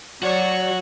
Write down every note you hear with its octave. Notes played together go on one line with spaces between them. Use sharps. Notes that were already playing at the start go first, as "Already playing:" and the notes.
F#3 F#4 C#5 D5